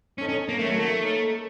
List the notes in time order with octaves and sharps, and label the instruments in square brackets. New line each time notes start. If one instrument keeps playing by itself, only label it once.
[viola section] C4 D#4 A4 [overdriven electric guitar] C#4
[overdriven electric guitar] C#4
A#3
[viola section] D#3 A#3 C#4 A4 C#5 [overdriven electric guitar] A3
[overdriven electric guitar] F#3
A3
[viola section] A#3 D#4 A#4 C#5